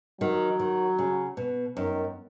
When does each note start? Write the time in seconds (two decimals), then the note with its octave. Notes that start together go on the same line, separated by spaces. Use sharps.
0.21 D#3 F#3
0.59 D#3
0.98 C#3
1.37 B2
1.77 F#2 D#3